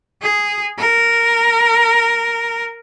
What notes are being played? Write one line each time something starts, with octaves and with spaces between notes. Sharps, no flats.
G#4
A#4